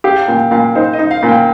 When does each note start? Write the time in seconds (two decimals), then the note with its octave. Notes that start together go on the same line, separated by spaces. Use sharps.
0.04 G4 F5
0.27 A#2 G5
0.51 A#2 F5
0.75 D#4 C5
0.93 D#5
0.99 D#4
1.11 F5
1.23 A#2
1.29 G5